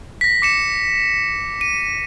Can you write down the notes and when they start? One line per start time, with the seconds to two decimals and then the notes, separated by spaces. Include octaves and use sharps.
0.21 A#6 B6
0.42 D6 C#7 E7
1.61 D#7